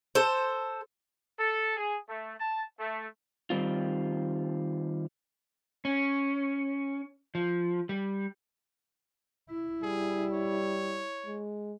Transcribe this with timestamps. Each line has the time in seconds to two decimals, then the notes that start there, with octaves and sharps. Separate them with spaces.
0.15 A4 C5
1.38 A4
1.77 G#4
2.08 A3
2.39 A5
2.78 A3
3.50 D#3 G3 C4 F4
5.85 C#4
7.35 F3
7.89 G3
9.50 E4
9.83 G3 G#4
10.32 C#5
11.26 G#3